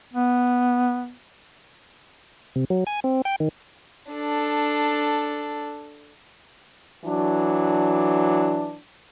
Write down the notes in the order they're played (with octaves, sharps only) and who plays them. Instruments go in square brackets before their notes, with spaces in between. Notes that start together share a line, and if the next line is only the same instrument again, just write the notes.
[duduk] B3
[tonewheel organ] C3
F#3
G#5
C4
G5
D#3
[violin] D4 A4
[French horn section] E3 F#3 D4